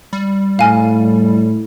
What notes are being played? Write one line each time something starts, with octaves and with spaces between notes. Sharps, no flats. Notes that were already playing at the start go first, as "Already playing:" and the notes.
G3
A2 F5 G#5 F6